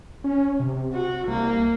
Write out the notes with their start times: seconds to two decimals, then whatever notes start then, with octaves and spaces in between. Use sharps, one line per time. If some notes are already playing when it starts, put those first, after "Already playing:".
0.24 C#4
0.60 C3
0.93 F#4
1.27 C2 A#3